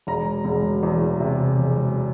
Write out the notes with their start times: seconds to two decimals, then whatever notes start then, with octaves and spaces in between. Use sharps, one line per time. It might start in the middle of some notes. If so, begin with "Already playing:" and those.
0.07 E1 A#5
0.45 E1
0.83 E2
1.20 C3
1.58 E1